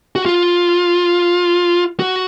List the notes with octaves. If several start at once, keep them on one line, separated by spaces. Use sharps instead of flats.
F#4
F4
F#4